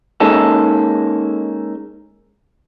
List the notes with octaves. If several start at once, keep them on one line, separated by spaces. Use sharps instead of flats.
G#3 A#3 C#4 D#4 A4